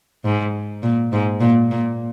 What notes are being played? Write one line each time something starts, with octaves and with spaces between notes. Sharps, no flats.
G#2
A#2
G#2
A#2
A#2